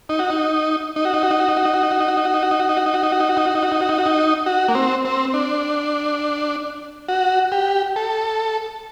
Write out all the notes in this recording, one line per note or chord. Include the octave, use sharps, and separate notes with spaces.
D#4
F#4
D#4
D#4
F#4
D#4
F#4
D#4
F#4
D#4
F#4
D#4
F#4
D#4
F#4
D#4
F#4
D#4
F#4
D#4
F#4
D#4
F#4
D#4
F#4
D#4
F#4
D#4
F#4
D#4
F#4
D#4
F#4
D#4
F#4
D#4
F#4
D#4
F#4
D#4
F#4
A#3
C4
C4
D4
F#4
G4
A4